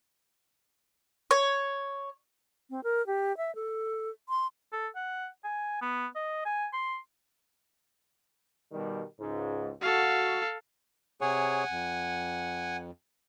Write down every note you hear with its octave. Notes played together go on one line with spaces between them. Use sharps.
C#5
C4
A#4
G4
E5
A4
C6
A4
F#5
G#5
B3
D#5
G#5
C6
B2 D#3 G3
C#2 G#2
F#4 A4 F5
C3 G#4 C#5 F#5 G#5
F2